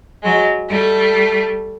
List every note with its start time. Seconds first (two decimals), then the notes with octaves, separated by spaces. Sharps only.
0.23 F#3 G#3
0.68 G3 A3